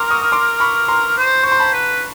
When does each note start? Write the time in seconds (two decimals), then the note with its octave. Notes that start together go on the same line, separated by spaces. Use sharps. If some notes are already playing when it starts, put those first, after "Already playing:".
Already playing: A#4 A#5 C6 D6
0.10 C#6 D#6
0.22 D#6
0.32 C6 D6
0.60 B5 C#6
0.88 A#5 C6
1.17 C5
1.43 C5 C#6
1.52 C6
1.59 A5 B5
1.73 B4